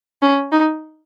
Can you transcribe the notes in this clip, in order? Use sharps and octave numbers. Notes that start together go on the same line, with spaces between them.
C#4
D#4